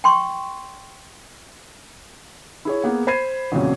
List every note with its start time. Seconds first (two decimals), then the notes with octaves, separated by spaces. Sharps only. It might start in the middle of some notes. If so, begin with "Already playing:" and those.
0.04 G5 C6 C#6
2.65 E4 G#4 C#5
2.84 A#3 B3 G#4
3.07 C5 B5 G#6 C7 D#7
3.52 A1 F2 A#2 C#3 F#3